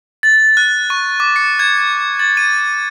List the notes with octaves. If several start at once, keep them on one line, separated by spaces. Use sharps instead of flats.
A6
F#6
C#6
D6
C#7
G#6
A6
D#7